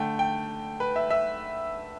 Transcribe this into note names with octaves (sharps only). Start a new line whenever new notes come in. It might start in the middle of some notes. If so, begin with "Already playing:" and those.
Already playing: D3 A3 G5
G5
B4
E5
E5